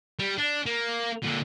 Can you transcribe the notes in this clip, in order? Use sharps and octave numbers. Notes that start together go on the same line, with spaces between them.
G3
D4
A#3
A#2 D3